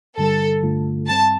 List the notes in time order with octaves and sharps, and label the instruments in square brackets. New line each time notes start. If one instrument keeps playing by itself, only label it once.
[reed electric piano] G2 D3 G3 [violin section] A4
[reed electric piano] G2 D3 A3 F4
[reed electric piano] G2 G3 C4 [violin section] A5